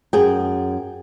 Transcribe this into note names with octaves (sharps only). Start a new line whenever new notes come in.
F#2 G#4 G5